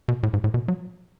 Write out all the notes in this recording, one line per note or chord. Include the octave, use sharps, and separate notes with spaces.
B2
A2
G#2
A2
B2
F#3